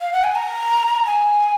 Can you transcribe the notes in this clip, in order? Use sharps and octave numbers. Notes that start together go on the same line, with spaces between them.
F5
F#5
G#5
A#5
G#5